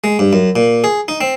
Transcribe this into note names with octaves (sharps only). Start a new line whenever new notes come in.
G#3
G2
F#2
A#2
G#4
D#4
C4